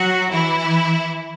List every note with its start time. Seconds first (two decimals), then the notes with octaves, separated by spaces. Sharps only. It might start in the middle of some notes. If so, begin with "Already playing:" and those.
Already playing: F#3 F#4
0.32 E3 E4